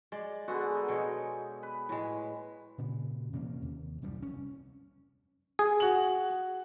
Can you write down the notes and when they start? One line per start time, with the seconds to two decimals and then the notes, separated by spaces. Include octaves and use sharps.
0.12 G#3 D5
0.48 D3 G#3 B3 F#4
0.74 D#4
0.88 B2 G#3 C#5
1.63 B4
1.89 A2 G#3
2.78 A#2 C#3
3.33 E2 C3 A#3 C#4
3.62 D#2
4.02 C2 F#2 A2 G3
4.22 F1 C#4
5.59 G#4
5.80 F#4 F#7